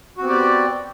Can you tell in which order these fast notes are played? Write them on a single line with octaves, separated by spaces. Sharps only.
F#4 C4 B3 G4 D5